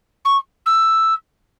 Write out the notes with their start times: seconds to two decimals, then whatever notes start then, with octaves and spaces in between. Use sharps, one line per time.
0.25 C#6
0.66 E6